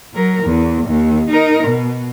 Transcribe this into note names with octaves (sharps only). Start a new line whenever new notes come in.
F#3 A#4
E2
D#2
D#4 A#4
B2